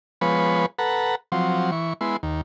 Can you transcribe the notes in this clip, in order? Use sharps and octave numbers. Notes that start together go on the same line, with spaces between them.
F3 G#3 B3 B4 C#5
A4 B4 F#5 A#5
F3 F#3 C4
E3 C#6
G#3 B3 E4 C6
D#2